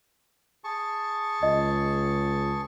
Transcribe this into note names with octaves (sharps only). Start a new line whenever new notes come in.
G#4 A5 C#6
C#2 D#5